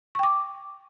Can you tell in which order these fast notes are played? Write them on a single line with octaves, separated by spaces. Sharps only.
C#6 G5 D6